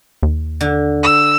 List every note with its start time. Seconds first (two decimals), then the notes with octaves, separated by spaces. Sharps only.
0.23 D#2
0.61 D3
1.03 E6